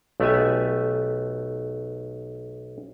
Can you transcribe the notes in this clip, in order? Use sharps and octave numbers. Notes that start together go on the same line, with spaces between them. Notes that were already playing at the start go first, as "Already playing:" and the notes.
B1 A3 B3 G4 E5 G#5